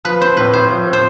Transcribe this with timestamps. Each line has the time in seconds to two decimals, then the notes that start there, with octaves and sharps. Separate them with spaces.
0.05 F3 B4
0.21 C4 C5
0.37 A2 B4
0.53 A2 C5
0.70 F3
0.87 C4
0.93 C5